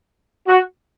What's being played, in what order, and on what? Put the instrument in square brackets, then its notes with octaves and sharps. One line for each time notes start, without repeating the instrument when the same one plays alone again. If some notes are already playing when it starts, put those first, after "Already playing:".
[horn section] F#4